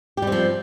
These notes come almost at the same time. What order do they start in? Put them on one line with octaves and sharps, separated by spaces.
G4 G3 C4 F3